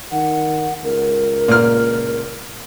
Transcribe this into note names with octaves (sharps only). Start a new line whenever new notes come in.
D#3 F#5
C#2 A#4
A#2 F6